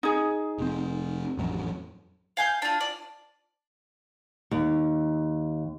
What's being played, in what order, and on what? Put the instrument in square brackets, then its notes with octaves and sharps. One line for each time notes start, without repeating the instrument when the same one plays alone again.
[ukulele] D#4 G#4
[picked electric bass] F1 C4
A1 F2 F#3
[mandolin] F5 G#5 G6
D4 F4
D5
[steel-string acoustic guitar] D#2